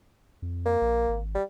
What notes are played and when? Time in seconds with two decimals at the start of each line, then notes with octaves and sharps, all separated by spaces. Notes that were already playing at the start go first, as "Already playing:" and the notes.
0.42 F2
0.66 A#3
0.81 A#1
1.08 G#1
1.35 G3